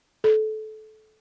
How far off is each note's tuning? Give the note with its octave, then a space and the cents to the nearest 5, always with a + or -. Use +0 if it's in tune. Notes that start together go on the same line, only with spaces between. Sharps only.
A4 -20